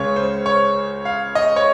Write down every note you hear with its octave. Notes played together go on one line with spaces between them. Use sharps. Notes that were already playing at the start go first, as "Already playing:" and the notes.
Already playing: C#2 C#3 G#3 C#5
C5
C#5
F5
D#5
C#5